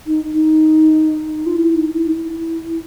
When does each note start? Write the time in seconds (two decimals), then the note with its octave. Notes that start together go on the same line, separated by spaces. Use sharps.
0.07 D#4
0.33 D#4
1.46 F4
1.56 E4
1.75 D#4
1.93 E4
2.07 D#4
2.12 E4